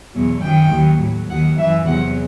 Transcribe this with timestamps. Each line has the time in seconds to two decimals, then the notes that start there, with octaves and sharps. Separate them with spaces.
0.14 E2 B2 F#3
0.42 F#2 D#3 F#3 G5
0.71 D#2 D#3 F#3
1.00 A2 F#3
1.29 D#2 D#3 F#3 F#5
1.58 F#2 E3 E5
1.87 E2 C3 F#3 F#5